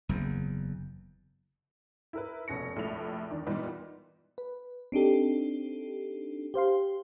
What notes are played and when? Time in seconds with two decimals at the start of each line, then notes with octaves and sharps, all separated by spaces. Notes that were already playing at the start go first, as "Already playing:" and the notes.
0.09 F#1 E2
2.13 E4 A#4 B4
2.48 F1 B2 C#4 A#6 C#7
2.75 F1 A#1 A2 E5 F7
3.31 E2 D#3 D4
3.47 A#2 E3 G3 B3 D#4
4.38 B4
4.92 C4 D4 D#4 G4 A4
6.54 G4 C5 F5 C6